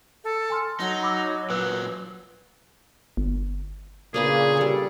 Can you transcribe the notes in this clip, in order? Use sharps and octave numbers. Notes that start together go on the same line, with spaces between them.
A4
G#5 C6 F6
F#3 D#4
B5 D6 E6
A#2 F#3 B4 E6 F#6
G1
A#2 C#3 A#3 D4 G#4 B4
G3 A4